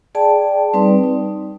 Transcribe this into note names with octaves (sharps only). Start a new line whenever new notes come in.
G#4 D5 G5 A5
G3 C4 D#4 B4 D5
D#4